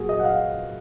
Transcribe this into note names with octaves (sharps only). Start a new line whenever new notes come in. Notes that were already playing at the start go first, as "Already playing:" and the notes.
Already playing: A#2 F#3 A#3 F#4 G#4
D#5
F#5
F5